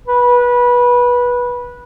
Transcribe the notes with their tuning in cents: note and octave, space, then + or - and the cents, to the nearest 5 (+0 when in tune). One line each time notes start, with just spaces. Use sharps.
B4 -20